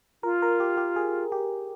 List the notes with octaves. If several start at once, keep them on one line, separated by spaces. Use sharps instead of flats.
F4 A#4
A#4
G4
G4
G#4
G4